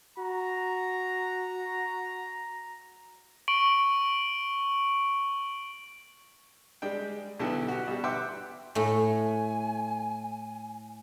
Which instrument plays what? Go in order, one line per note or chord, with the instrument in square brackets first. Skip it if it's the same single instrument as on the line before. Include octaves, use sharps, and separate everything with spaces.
[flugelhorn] F#4 [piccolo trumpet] A#5
[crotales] C#6 D7 F#7 G7
[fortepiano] G3 G#3 D4 G5
G#3
B1 D3 G3 B3 E4 A5
F#4 G4
B2 G3
E5 F#5 G5 C6 D6 F#6
[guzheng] A2 A3 [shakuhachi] G#5